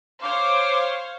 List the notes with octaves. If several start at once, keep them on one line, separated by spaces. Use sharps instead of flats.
C5 C#5 F5 D6